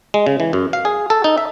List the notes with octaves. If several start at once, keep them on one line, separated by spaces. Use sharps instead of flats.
G#3
C#3
E3
F#2
F5
G#4
A4
D#4
E5